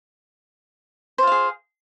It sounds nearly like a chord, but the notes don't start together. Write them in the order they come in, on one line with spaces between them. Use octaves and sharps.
C5 F4 F5 G#4